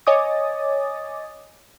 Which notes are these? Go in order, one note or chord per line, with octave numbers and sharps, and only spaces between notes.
C#5 D#5 G#5 D6 D#6 A6